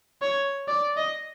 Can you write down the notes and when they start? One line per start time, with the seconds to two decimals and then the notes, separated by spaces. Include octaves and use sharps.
0.22 C#5
0.68 D5
0.97 D#5